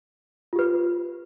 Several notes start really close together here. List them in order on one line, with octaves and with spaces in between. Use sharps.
F4 G4 B4